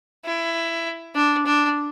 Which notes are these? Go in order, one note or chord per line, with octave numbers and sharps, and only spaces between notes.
E4
D4
D4